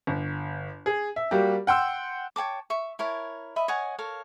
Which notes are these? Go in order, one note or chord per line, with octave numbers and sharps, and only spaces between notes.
G1
G#4
E5
G3 A#3 F#4 G4
F#5 G5 C6 E6
C#5 G5 A5 D6
E5 C#6
E4 A#4 C#5 A5
D#5 E5 B5
C#5 D#5 F#5 G#5
A4 A#4 C#5 F5